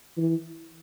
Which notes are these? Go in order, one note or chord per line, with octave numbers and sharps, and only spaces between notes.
E3